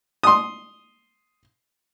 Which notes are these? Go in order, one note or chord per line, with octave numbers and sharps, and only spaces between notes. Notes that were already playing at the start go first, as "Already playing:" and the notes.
C6 D#6